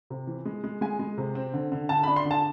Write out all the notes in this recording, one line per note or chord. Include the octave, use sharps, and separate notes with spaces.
C3
E3
G#3
G#3
G#3 G#5
G#3
C3
C4
D3
D3
D3 A5
B5
D4
C6
D3
A5